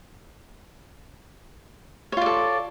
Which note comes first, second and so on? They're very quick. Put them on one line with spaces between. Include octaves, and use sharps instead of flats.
C#5 F4 D5 A4